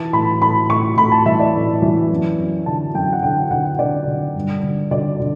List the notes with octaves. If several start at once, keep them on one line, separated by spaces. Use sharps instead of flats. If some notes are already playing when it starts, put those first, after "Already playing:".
Already playing: E3 A5
A2 B5
A2 B5
A2 C#6
A2 B5
A5
E3 E5
D5
A2
E3
F#2
F#2
D3 A5
F#2 G5
F#5
D3 G5
D3 F#5
D3 D5
D3
G2
D3
D3 D5
D3